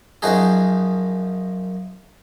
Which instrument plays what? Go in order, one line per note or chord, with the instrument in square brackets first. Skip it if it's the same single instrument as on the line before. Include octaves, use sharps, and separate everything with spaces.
[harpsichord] F#2 F3 D#4 F#4 G#4